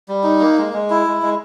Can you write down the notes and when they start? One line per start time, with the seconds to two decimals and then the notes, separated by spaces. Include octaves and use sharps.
0.08 G3
0.24 D#4
0.40 A#3
0.58 G#3
0.73 G#3
0.90 E4
1.07 G#3
1.23 G#3